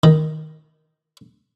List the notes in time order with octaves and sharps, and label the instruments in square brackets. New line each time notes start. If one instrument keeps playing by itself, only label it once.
[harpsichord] D#3